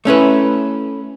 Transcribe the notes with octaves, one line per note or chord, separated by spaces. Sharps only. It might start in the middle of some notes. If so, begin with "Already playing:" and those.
A3 C#4 E4 B4